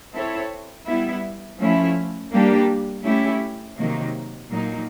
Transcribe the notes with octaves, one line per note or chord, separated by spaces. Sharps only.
C4 E4 A4 C#5 E5
G3 B3 E4
F3 A3 C#4 E4
G3 A#3 D4 G4
A3 C#4 E4 G4
C3 D#3 F#3 A#3 D#4
A#2 F#3 A#3 D#4